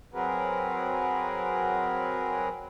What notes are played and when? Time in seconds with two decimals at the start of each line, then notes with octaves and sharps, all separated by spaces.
0.14 F#3 C4 F#4 G#4 A#4 B4